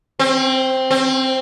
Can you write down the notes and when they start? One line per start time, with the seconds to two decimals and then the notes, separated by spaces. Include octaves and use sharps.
0.19 C4
0.91 C4